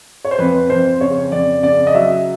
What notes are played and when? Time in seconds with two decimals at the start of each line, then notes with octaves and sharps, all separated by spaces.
0.25 C#5
0.31 C5
0.39 F2 B4
0.70 F2 C5
1.01 C#3 C#5
1.32 F2 D5
1.63 C#3 D5
1.87 D#5
1.94 F#3 E5